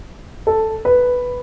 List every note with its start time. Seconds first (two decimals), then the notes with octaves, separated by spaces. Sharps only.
0.47 A4
0.85 B4